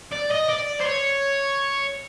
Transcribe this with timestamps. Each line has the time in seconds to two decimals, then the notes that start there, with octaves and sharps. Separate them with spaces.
0.12 D5
0.31 D#5
0.49 D5
0.80 C5
0.86 C#5